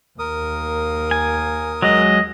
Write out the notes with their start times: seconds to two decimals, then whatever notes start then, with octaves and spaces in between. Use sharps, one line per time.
0.19 D#2 A#3 A#4 D#6
1.11 G#5
1.82 F#3 G#3 D#5